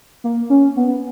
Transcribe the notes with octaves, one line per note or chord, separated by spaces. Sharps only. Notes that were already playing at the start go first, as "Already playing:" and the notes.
A#3
C#4
B3